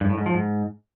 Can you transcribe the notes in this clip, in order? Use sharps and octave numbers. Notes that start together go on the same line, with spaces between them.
G2
A2
G#2
F3
G#2